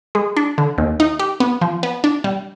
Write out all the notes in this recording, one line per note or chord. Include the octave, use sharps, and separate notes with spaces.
G#3
D4
D3
D#2
D#4
G4
B3
F3
B3
D4
G3